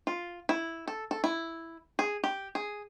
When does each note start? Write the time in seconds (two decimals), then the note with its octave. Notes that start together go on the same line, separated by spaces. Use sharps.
0.07 F4
0.49 E4
0.88 A4
1.11 A4
1.24 E4
1.99 G#4
2.24 G4
2.55 G#4